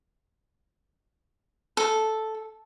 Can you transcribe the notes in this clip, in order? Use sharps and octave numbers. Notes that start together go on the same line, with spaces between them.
A4